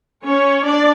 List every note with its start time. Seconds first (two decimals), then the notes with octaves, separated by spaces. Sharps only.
0.24 C#4 C#5
0.64 D4 D5